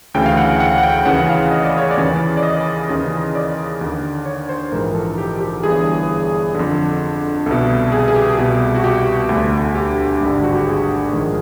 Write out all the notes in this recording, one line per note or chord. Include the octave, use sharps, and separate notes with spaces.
D2 C#3 E3 G5
F5
F#5
F#5
F#5
G5
D#2 C#3 E3 F#5
F5
D#5
D5
C#5
D5
D#2 C#3 E3
D5
D#5
D#2 C#3 E3
D5
D#2 D3
C#5
C5
A#1 G#2 E3 A#4
A4
G4
G4
G1 G2 E3 G#4
F2 D3
C2 B2 A4
G#4
G#4
G4
C2 B2
F#4
G4
D2 D3
G4
G#1 G2 D3
F#4
G4
G#4
A#1 G#2 D#3